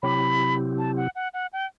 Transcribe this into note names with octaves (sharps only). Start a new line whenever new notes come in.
C3 F#3 C4 E4 G4 B5
A5
F#5
F#5
F#5
G5